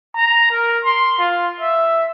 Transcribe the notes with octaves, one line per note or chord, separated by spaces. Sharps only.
A#5
A#4
C6
F4
E5